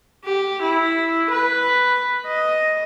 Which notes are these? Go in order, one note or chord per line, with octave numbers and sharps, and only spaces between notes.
G4
E4
B4
D#5